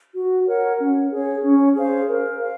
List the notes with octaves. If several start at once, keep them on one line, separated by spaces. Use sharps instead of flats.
F#4
A#4 C#5 F#5
C#4
G#4 C#5
C#4
G#4 C5 F5
A#4
F5